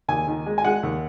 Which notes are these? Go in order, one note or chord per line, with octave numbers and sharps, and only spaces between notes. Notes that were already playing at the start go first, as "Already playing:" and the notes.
D#2 G#5
D#3
G#3
G#5
G#3 F#5
D#2